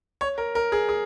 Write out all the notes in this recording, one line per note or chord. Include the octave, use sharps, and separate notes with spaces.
C#5
A#4
A#4
G#4
G#4